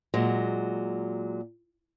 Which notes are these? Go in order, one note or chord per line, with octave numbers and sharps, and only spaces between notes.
A#2 F#3 G#3